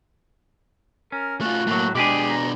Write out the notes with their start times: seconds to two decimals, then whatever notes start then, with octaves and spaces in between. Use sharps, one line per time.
1.12 C#4 A#4
1.41 A3 F4 F#4
1.67 A2 F#3 A3 A#3
1.95 B2 G#3 D4 G4 G#4 D6
2.29 A#5